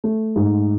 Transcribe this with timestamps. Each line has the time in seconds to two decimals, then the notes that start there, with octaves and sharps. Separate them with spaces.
0.04 A3
0.36 G#2